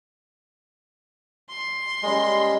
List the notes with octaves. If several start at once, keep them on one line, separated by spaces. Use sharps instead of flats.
C6
C#3 G3 G#3 A#3